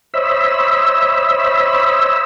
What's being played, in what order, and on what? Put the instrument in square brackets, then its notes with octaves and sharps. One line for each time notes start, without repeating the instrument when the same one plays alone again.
[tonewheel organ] C5 C#5 D#5 E5 B5 E6